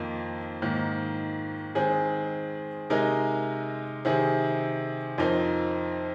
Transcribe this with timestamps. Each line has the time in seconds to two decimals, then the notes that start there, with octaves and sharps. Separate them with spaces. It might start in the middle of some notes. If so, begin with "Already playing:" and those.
Already playing: F2 D#3 A#3 D#4
0.62 G#2 D#3 A#3
1.75 D#3 G#3 C4 G#4
2.90 C3 G#3 D#4 A#4
4.05 C3 D#3 C4 G#4
5.18 F2 F3 C4 D#4 A#4